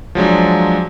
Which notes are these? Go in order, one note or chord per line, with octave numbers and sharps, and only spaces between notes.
F3 F#3 G#3 D4